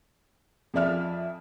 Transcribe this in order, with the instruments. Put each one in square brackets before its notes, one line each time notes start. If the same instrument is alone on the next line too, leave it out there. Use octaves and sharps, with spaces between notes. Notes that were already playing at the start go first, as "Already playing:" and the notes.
[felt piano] F2 F3 G#4 D5 E5 F6